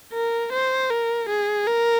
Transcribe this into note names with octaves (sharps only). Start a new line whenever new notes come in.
A#4
C5
A#4
G#4
A#4